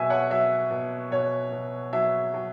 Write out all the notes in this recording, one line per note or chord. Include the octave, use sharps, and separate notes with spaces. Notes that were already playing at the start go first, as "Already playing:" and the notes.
Already playing: B2 F#3 E5 G#5
C#5 F#5
F#3 E5
B2
B2 C#5
B2
F#3 E5
F#3